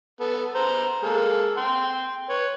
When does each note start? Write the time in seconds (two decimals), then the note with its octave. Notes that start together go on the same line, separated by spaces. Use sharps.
0.20 B3 A4
0.55 B3 C5 A#5
1.03 G#3 A#3 A4
1.57 G5 C6
2.29 B4 C#5